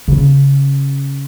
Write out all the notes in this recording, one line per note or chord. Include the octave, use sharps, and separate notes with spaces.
C#3 C#4